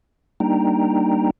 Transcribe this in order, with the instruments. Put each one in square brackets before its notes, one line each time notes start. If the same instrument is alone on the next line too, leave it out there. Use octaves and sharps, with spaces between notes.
[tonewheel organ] G3 A#3 D4 D#4 G5 A#5